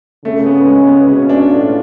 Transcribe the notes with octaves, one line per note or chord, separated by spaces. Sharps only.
C#3 A3
B3
G#3
B3
B2 C#4
C#4
D4
A2 F4